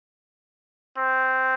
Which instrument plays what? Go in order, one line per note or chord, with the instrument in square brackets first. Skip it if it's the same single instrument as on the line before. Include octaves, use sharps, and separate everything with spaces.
[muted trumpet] C4